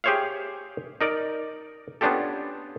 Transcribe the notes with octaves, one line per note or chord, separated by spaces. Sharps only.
G4 G#4 C5 C#5 E5 F5
D#4 A#4 D5
B3 C#4 D4 F4 G4 A4